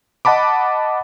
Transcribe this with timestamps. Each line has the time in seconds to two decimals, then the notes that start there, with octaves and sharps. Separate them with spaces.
0.25 D#5 F#5 A5 B5 D6